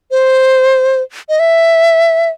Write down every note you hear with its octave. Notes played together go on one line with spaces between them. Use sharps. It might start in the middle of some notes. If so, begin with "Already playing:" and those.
C5
D#5
E5